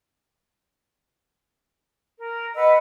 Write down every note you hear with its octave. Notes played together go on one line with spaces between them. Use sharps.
A#4
B4 D#5 F#5 E6